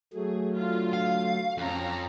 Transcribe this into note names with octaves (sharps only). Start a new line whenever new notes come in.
F#3 A3 G#4
D3 F4
F5
F2 C#4 A#5